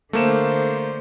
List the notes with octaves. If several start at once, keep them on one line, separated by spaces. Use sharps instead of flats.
D3 A3 A#3 C5 E7